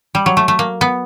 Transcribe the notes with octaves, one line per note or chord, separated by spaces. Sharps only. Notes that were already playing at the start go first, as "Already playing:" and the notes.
G3
F#3
A3
A3
A#3
B3